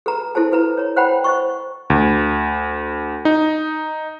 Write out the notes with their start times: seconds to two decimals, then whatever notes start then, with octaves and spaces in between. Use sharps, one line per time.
0.06 A4 B4 A#5
0.35 E4 A4 C5 A5
0.52 A4 B4 A#5
0.77 C#5 A#5
0.97 C5 F#5 G5 A#5 B5
1.24 C5 D#5 C#6
1.90 D2
3.25 D#4